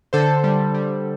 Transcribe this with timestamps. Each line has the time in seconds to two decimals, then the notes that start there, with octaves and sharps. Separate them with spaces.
0.13 D3 A4 C5
0.44 G3
0.74 G3